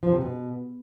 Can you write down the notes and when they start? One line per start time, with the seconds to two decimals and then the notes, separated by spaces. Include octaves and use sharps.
0.03 F3
0.12 C3
0.21 B2